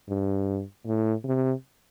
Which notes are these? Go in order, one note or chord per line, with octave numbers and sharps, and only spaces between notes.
G2
A2
C3